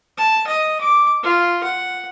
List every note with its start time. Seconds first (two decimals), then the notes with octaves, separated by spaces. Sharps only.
0.17 A5
0.47 D#5
0.80 D6
1.23 F4
1.63 F#5